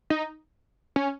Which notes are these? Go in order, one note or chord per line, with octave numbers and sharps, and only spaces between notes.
D#4
C#4